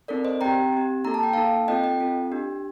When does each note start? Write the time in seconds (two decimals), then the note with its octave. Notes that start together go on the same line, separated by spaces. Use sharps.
0.08 C4 D#4 A4 A#4 D5
0.25 C5 D#5
0.41 C4 G4 G5 A#5
0.73 C4 G4
1.04 A#3 D#4 A4 A#5
1.14 A5
1.23 G5
1.33 A#3 D#4 A4 F5 A5
1.68 C4 F4 A4 D#5 G5
1.84 D#5 G5
2.00 C4 F4 A4
2.32 D4 G4